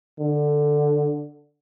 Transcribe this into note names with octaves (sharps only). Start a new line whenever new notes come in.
D3